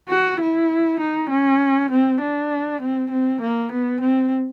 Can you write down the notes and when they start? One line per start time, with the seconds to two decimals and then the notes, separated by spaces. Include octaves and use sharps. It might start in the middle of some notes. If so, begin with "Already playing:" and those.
0.09 F#4
0.41 E4
1.00 D#4
1.30 C#4
1.91 C4
2.21 D4
2.82 C4
3.11 C4
3.41 A#3
3.72 B3
4.01 C4